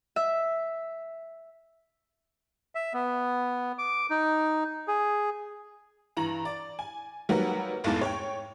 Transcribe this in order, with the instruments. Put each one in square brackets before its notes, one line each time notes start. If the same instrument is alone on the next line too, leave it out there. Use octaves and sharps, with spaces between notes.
[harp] E5
[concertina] E5
B3
D6
D#4
G#4
[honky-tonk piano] G2 E3 A#5 F#7
D5
G#5
F#3 G3 A#3 D#4 B4 F#5
F1 B1 E2 G#2 E3 A4
C#5 G5